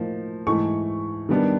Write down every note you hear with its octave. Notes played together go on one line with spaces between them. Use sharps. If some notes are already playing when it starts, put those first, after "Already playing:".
Already playing: A2 F3 A#3 D#4
G#2 E3 A3 C#6
D#3 G3 B3 D4